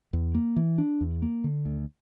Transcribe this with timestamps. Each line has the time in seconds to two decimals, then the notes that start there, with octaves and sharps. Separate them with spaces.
0.13 E2
0.35 A#3
0.56 E3
0.78 D4
1.01 E2
1.22 A#3
1.44 D3
1.65 D2